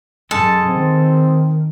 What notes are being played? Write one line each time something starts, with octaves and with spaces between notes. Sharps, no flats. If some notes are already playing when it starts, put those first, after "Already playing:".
F#2 G#3 A4 A5
D#3 C4